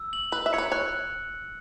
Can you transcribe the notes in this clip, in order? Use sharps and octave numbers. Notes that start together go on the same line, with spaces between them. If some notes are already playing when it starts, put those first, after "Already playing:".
Already playing: E6
F#7
B4 F#7
E5
C#5 C#7
B4
C#5 F#6